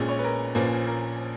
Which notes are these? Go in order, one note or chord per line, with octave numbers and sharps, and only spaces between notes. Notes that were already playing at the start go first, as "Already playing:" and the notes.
Already playing: A#1 A#2 G#3 C#4
C#5
B4
A#4
A#1 A#2 F3 A#3 C#4 B4
A#4